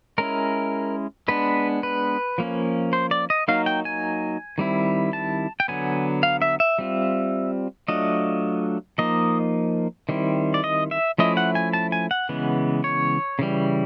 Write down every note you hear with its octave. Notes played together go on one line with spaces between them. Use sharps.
G#3 C#4 E4 A#4
G#3 B3 D4 B4
B4
F3 A#3 C#4
C5
D5
D#5
F#3 A#3 D#4 F5
G5
G#5
D#3 G3 C4 E4
A5
G5
D3 F#3 B3 G#5
F5
E5
E5
G3 C4 F4
F#3 A3 D4 F4 D#5
F3 A#3 D#4 D#5
D#3 G3 C4 E4
D5
D#5
E5
F3 A3 C#4 E4 D#5
F#5
G#5
A5
G#5
F#5
C#3 E3 G#3 B3
C#5
C#3 E3 G3